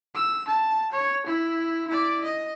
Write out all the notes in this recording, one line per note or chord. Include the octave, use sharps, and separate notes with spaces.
E6
A5
C#5
E4
E4 D5
D#5